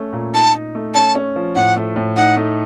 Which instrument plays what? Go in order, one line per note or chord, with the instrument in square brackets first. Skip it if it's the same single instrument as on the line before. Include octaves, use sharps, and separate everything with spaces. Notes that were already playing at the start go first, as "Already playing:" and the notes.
Already playing: [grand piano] A3 C#4
A#2
[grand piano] D#4 [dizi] A5
[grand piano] D#4
A3
[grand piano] C#4 [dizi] A5
[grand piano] C#4
F3
[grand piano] A2 [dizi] F#5
[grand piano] A3
A2
[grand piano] D#4 [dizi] F#5
[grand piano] A3